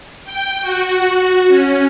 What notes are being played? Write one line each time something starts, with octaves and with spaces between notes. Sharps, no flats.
G5
F#4
C#4